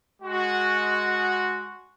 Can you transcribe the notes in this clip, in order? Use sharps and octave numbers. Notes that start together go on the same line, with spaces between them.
G#3 F#4